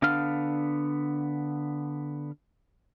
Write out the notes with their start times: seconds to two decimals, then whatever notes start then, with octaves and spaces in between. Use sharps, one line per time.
0.02 D3 B3 D4 F5 F6